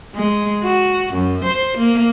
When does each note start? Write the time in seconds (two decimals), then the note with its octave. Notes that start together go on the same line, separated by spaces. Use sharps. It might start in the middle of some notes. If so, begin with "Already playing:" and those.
0.15 G#3
0.63 F#4
1.14 F#2
1.44 C5
1.78 A#3